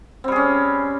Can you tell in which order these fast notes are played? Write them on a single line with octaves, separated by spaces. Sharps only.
C4 G3 G#4 C#4